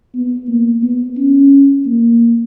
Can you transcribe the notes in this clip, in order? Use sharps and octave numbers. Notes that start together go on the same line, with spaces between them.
B3
A#3
B3
C#4
A#3